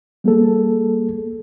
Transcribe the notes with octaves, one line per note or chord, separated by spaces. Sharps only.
G3 A#3 G#4 A4